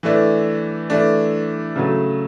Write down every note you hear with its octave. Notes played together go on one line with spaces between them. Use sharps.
E3 A3 D4
E3 A3 D4
C#3 F#3 A3